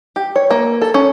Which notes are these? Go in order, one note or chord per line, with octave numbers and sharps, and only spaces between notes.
G4
C#5
A#3
A4
C#4